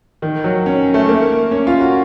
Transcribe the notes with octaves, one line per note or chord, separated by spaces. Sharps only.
D#3
F#3
C#4
A3
A#3
C#4
F4
F#4